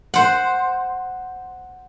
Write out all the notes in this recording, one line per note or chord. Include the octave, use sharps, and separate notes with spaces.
C5 F#5